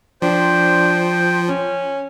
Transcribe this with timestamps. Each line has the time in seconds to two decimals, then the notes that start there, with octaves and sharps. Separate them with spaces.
0.22 F3 D4 C5 G5
1.48 C#4